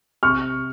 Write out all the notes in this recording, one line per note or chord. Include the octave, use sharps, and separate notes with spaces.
C3 C#6 F6